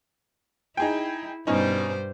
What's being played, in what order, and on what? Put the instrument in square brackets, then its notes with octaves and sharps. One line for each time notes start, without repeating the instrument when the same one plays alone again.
[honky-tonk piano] D#4 G#4 G5 [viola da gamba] E4
[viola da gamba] G2 G3 C5 [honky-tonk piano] B2 C#4 D#4